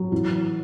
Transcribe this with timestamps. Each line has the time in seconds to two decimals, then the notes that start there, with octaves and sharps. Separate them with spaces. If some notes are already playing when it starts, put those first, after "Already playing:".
Already playing: F#3
0.12 E3